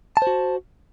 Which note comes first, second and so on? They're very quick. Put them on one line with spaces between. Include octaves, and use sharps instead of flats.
A5 C5 F#4